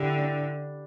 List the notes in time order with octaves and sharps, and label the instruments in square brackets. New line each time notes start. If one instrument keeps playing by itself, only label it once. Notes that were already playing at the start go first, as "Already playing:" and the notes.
Already playing: [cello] D3 [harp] E4 G4
[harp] D4